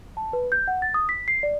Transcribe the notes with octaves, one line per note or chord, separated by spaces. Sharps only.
A5
B4
G6
F#5
A6
D#6
B6
C7
D5